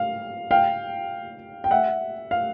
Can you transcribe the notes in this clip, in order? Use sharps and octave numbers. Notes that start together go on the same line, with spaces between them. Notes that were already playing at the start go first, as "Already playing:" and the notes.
Already playing: F5
F5 G5
G5
E5 F#5
F5